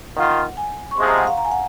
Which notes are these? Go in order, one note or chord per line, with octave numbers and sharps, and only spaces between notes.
D#3 A#3 F4 F#5
G#5
C#6
C3 F3 G#3 C6
A#5
F#5
F5
A#5
G#5
F#5